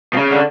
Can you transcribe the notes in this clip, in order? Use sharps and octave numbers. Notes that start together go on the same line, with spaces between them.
B2
C#3
D3